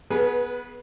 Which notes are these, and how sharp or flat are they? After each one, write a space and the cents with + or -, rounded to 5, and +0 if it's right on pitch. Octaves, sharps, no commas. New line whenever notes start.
B3 +0 G#4 +15 B4 -25